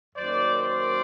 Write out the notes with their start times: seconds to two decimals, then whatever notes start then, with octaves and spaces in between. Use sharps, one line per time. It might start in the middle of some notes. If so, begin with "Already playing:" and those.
0.15 F#2 D#3 F#3 A#3 C5 D5
0.60 C5 D5